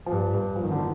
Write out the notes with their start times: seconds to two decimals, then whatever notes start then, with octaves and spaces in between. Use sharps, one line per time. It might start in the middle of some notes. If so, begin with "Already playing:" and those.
0.06 F3
0.11 G2 G3
0.33 G2 G3
0.56 F3
0.64 D#3
0.72 D3
0.78 D#3